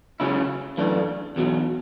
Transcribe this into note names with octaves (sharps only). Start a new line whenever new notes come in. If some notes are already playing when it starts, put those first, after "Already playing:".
C#2 C#3 F#3 C#4 E4
F#2 E3 A3 D4
E2 B2 F#3